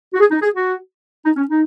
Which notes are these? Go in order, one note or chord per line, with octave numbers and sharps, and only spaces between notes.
F#4
G#4
D#4
G#4
F#4
D#4
C#4
D#4